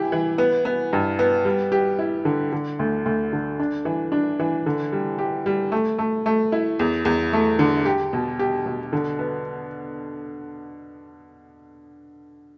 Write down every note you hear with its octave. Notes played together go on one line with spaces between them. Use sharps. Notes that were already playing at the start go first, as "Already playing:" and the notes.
Already playing: E3 E4 G4
E3
B3
B3
G2
B3
G3
G4
E4
D3
D3
D2
D2
D3
D4
E3
D4
E3
D3
G3
G4
G3
A3
A3
A3
E4
E2
E2
A3
D3
G4
B2
G4
B2
D3
B3